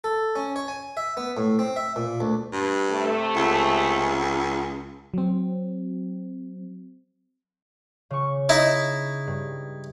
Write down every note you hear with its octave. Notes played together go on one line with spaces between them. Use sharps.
A4
C#4
C#5
G#5
E5
B3
A2
C4
E5
A#2
D2
G2
C3 A3
C#2
F#3 C4
C#3 C#6
D#4 E4
G2